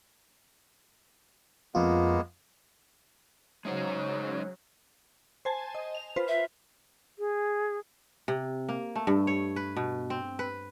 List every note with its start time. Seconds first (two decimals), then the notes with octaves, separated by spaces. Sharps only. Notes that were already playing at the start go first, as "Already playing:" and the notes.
1.75 F2 G#3 A#3 B3 F4
3.65 C#3 F#3 G#3 D#4 C5 C#5
5.45 C5 G#5 A5
5.75 D#5
5.95 F7
6.16 F4 B4 C5
6.28 E5
7.19 G#4
8.28 C3
8.69 A#3
8.96 A3
9.07 G2
9.27 C#5
9.56 B4
9.77 B2
10.10 C4
10.39 B4